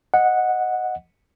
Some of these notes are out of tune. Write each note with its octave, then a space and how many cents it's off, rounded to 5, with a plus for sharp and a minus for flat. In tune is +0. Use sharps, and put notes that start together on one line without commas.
D#5 +0 F#5 -10